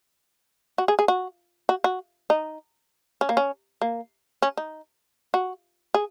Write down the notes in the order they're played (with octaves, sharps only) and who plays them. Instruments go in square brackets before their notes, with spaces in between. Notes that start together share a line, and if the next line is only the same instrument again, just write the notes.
[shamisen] F#4
G#4
G#4
F#4
F#4
F#4
D#4
C#4
A#3
C#4
A#3
C#4
D#4
F#4
G#4